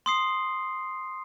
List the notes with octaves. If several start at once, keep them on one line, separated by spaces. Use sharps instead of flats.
C6 D#6 C7